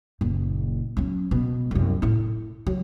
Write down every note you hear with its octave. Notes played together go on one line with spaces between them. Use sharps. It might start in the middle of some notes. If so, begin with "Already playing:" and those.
F#1 A#2
F#3 C#4
B2
C2 F#2
A2 E4
F#3